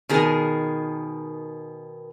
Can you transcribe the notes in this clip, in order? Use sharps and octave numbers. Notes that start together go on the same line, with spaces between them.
B2 D#3 G#4 A#4